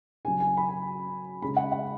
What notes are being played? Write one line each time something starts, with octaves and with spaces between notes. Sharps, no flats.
C#3 F#3 G#5
G#5
B5
G#5
C#3 G#3 B5
F#5
F#5